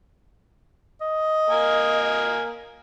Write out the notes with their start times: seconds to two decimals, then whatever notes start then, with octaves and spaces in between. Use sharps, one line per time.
1.01 D#5
1.50 A#3 A#4 G#5